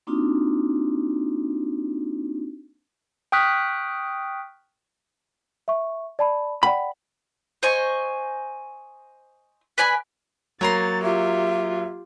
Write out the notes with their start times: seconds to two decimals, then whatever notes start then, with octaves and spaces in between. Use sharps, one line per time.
0.07 A#3 C4 D4 D#4 F4 F#4
3.32 G5 C#6 D#6 F6 F#6 B6
5.68 E5 C#6
6.19 D5 A5 B5
6.63 D5 F#5 G5 B5
7.63 C5 D#5 G#5 C#6
9.78 B4 D5 G#5 B5
10.61 F#3 A#3 C#5 A#5 C6 A6
11.03 F4 G4 E5